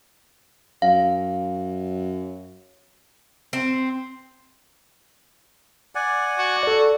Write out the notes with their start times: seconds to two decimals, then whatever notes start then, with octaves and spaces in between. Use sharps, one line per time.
0.82 F#2 F5
3.53 C4
5.95 D5 F#5 G#5
6.38 F#4
6.63 A4 D5